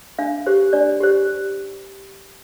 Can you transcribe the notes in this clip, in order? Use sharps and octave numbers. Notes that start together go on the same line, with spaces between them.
D4 F5
G4 C5
D4 D5
G4 C5